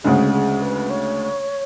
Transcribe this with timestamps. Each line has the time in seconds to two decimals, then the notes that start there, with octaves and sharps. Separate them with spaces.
0.04 D2 C#3 G#3 G#4
0.33 G#4
0.62 B4
0.90 C#5